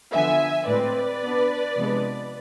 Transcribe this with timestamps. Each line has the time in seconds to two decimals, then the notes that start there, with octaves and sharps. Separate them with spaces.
0.13 D3 F3 B3 E5 G#5
0.67 A2 G#3 C4 B4 D5
1.21 B2 B3 D4
1.75 C3 F3 G#3 B3 D4